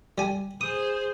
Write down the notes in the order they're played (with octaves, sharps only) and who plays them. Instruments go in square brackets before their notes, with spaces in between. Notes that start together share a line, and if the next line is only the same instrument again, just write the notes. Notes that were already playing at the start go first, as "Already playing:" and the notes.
[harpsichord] G3 G#5
[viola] G#4 C5 [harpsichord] D#6